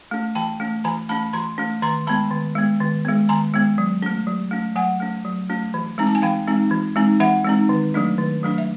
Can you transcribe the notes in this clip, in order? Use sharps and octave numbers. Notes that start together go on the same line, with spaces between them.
A3 C#4
E3 G5 A5
A3 C#4
E3 G#5 A#5
A3 C#4 A5 B5
E3 A#5 C6
A3 C#4
D#3 A#5 C6
G#3 B3 A5 B5
D#3
G#3 B3
D#3
G#3 B3
D#3 G#5 A#5
G#3 B3
F#3
A3 C#4
F#3
A3 C#4
F#3 F#5 G#5
A3 C#4
F#3
A3 C#4
E3
G#3 C4 D#4 A#5
A5
G#5
E3 F5 G5
G#3 C4 D#4
E3
G#3 C4 D#4
E3 E5 F#5
G#3 C4 D#4
D#3
F#3 A3 D4
D#3
F#3 A3 D4
E5